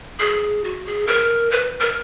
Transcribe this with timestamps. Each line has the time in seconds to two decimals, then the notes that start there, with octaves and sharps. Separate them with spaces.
0.20 G#4
0.64 F#4
0.86 G#4
1.07 A#4
1.51 B4
1.81 A#4